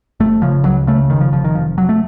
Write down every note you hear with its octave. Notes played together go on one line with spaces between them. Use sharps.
F1 A3
C#3 F3
C#2 F#3
C#3 A3
F1 D#3
F3
F1 F3
D#3
F1 F3
F1 F#3
A3